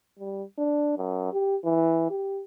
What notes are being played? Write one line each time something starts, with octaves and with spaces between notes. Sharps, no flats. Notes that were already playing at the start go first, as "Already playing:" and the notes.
G3
D4
F#2
G4
E3
G4